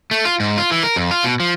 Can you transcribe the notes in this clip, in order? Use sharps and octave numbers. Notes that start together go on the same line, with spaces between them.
A3
F4
G#2
F4
E3
A#4
F2
F4
B2
F3